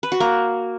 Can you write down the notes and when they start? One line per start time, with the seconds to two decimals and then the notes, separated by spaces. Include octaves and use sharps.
0.03 B4
0.12 F#4
0.20 A#3